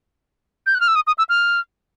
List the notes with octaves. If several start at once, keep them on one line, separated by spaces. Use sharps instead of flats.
G6
F#6
F6
E6
D#6
D#6
E6
F6